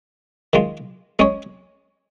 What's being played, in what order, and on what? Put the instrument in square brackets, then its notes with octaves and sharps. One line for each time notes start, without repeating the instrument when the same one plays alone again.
[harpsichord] D#3 G#3 F4
G#3 C#4 G#4 C#5